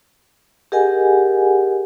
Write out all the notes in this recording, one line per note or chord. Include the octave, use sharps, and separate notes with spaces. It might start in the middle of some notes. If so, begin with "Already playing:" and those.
G4 G#4 A#4 D#5 F#5 G#5